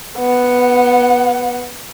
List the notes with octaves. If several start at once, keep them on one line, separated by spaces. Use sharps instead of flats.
B3 F#5